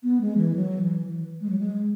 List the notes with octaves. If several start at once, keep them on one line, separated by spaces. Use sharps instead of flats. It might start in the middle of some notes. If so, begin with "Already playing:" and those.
B3
G#3
E3
F#3
E3
E3
G#3
F#3
G#3